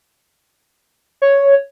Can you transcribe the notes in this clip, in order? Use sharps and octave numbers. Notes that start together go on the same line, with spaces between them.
C#5